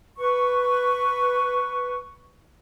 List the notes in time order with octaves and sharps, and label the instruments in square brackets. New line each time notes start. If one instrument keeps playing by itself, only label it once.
[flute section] B4 C#6